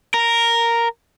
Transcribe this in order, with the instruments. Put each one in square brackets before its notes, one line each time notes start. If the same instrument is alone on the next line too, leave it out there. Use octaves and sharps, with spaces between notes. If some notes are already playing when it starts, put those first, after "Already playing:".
[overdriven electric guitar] A#4